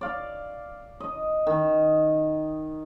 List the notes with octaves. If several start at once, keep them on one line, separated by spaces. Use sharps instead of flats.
D5 F5
D#5
D#3